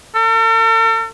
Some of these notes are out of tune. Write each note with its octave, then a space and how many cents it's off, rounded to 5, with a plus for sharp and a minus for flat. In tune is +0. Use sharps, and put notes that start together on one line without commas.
A4 +45